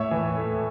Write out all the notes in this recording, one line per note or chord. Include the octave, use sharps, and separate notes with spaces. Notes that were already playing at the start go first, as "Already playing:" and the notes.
Already playing: A2 C#5 E5
E3
A3